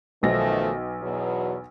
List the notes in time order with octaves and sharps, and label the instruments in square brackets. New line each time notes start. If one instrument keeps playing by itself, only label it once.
[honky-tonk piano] B1 A#6 [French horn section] D#3 F3 A3
[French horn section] E2 B2 F#3